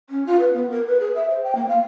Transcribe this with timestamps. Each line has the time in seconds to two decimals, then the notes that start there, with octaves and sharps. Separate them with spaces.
0.10 C#4
0.26 F4
0.40 B4
0.53 B3
0.71 A#4
0.87 B4
1.00 G#4
1.16 E5
1.30 C5
1.44 G5
1.55 A#3
1.69 F5